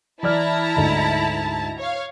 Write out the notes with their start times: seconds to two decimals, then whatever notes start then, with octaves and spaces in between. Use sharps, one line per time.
0.23 E3 E4 D5 A5 A#5 F6
0.76 D2 G#2 D3
1.78 C#5 F5